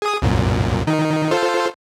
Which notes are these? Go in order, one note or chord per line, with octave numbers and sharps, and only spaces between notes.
G#4 D#6
C2 F#2 A#2
D#3 D#4
F4 A4 C5